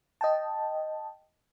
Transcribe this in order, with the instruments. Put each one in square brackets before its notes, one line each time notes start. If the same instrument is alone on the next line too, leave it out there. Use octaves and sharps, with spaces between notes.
[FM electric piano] D#5 G5 A5